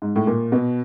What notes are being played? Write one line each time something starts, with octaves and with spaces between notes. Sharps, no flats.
G#2
A2
A#2
B2